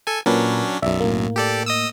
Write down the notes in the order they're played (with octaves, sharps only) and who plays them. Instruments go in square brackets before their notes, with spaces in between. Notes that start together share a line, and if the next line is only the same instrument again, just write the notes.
[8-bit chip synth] A4 G#5
[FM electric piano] A#2 A#4 B4 [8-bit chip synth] F#3 C#4 D4
[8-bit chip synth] B1 F#2 [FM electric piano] D5 E5
[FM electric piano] A2 A#3
[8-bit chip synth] G4 A4 D5
D#5 D#6 E6